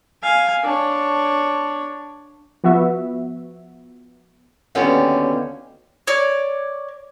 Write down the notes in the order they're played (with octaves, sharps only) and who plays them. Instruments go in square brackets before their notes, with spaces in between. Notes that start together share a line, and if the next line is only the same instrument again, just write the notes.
[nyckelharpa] F5 G#5
D4 C#5
[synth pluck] F3 B3 F#4 E5
[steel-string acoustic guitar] D#2 B2 D3 G3 B3 C#4
[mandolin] C#5 D5